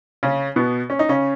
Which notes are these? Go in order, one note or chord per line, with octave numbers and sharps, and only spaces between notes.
C#3 C#4
B2 B3
C#4
D#4
C#3 C#4